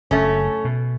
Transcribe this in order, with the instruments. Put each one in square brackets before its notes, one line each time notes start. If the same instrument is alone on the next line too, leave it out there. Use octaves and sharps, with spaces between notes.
[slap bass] F#1 [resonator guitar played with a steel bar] A3 C#4
[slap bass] B2